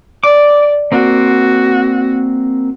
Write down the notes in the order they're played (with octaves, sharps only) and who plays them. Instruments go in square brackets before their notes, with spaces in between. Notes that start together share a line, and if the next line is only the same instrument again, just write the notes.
[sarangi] D5 [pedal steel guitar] D6
[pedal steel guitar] A#3 C4 [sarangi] F#4